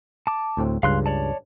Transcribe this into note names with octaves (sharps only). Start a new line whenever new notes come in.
A5 D6
D2 A2 C4
C#2 G2 C#3 F5 C6 F#6
C#5 D5 A5